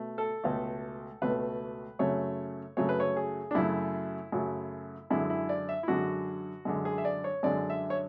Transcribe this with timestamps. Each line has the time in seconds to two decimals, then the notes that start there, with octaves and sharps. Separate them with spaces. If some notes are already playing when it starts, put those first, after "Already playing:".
Already playing: B2 A3
0.18 A4
0.44 C#2 B2 A3
1.22 C#2 B2 A3 B4
1.99 F#2 C#3 F#3 A3 C#5
2.77 F#2 C#3 F#3 A3 C#5
2.89 B4
3.00 C#5
3.16 G#4
3.51 D4
3.55 F#2 C#3 F#3 A3 E4
4.32 F#2 C#3 F#3 A3
5.10 F#2 D3 G#3 E4
5.30 E4
5.49 D5
5.69 E5
5.83 E4
5.88 F#2 D3 G#3 F#4
6.65 F#2 D3 G#3
6.85 G#4
6.98 E5
7.05 D5
7.24 C#5
7.43 F#2 D3 G#3 D5
7.70 E5
7.90 C#5